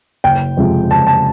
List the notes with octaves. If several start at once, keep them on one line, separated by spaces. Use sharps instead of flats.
F#1 G5
F2 C3 F3 G#3
F#1 A5
A5